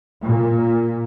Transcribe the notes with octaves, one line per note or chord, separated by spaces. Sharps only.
A#2